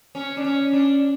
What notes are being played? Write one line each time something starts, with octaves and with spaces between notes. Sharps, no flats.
C#4
D4
C#4
D4